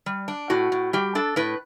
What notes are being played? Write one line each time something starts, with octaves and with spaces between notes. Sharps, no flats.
G3
D4
A2 F#4
A2
G3 G4
D4 A4
A2 B4